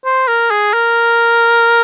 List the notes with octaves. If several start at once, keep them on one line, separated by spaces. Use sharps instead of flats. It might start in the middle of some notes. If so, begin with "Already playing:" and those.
C5
A#4
G#4
A#4